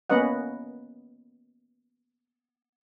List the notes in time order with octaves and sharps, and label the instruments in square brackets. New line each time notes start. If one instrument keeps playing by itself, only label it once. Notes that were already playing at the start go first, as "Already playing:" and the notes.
[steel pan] A#3 B3 C#4 B4 D#5 F#5